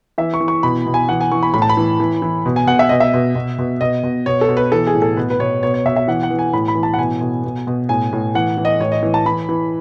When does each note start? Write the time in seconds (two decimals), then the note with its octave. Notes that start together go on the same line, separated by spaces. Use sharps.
0.18 E3 E5
0.34 C#6
0.41 E3
0.48 C#6
0.63 B2 B5
0.86 B2
0.94 G#5
1.09 E3 F#5
1.21 G#5
1.32 E3 C#6
1.43 B5
1.54 A2 B5
1.62 A5
1.69 B5
1.77 E3
2.00 E3
2.22 E3
2.46 B2
2.56 G#5
2.67 B2 F#5
2.79 E5
2.89 B2 D#5
3.00 E5
3.14 B2
3.35 B2
3.59 B2
3.81 B2 D#5
4.03 B2
4.26 B2 C#5
4.41 A4
4.49 B2
4.57 B4
4.72 E3 A4
4.87 G#4
4.95 A2
5.02 A4
5.17 B2 B4
5.30 B4
5.39 B2 C#5
5.63 B2 C#5
5.74 C#5
5.85 B2 E5
5.96 E5
6.08 E3 F#5
6.23 F#5
6.30 E3
6.39 G#5
6.53 A2 B5
6.68 B5
6.75 E3
6.83 A5
6.94 F#5
6.98 B2 G#5
7.21 B2
7.44 B2
7.67 B2
7.89 A2 G#5
8.13 A2
8.35 E3 F#5
8.57 E3
8.65 D#5
8.80 A2 C#5
8.92 D#5
9.03 E3
9.14 A5
9.26 E3 B5
9.49 E3